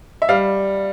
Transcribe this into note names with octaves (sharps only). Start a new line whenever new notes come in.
E5
G3 F5